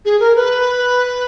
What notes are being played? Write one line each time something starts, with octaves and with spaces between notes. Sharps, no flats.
G#4
A#4
B4